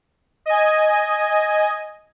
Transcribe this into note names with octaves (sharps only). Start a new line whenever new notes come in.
D#5 G#5